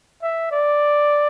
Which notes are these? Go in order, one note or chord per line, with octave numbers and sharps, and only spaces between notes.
E5
D5